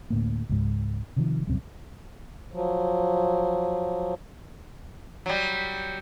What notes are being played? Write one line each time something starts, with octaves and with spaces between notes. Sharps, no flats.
D2 A2 A#3
C#2 G#2
C3 D#3 F3
D#1 C2 F#2 C4
F3 F#3
F#3 G3